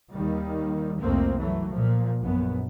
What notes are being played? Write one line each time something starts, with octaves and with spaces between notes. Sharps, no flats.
D#2 D#3 G3
C2 F2 A3 A#3 C4
F#2 E3 F#3 A3
A#2 F3
A#1 F#2 B3